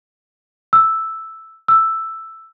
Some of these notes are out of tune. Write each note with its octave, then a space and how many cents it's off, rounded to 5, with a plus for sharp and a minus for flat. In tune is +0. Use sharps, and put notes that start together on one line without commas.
E6 +0
E6 +5